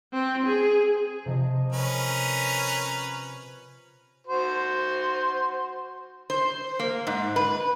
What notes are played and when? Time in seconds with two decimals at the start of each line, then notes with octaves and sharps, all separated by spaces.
0.13 C4
0.46 G#4
1.25 C3 F3 D#5
1.73 C#4 A#4 B4
4.27 F#4 C5
6.30 C5
6.79 A#3
7.07 G#2
7.36 B4